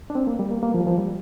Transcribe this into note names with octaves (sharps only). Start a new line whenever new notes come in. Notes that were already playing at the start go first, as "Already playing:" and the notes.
D4
C4
A#3
G3
A#3
A#3
F3
G3
F3
G3